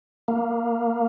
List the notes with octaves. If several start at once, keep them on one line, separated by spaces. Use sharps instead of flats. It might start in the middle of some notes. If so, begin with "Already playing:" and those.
A#3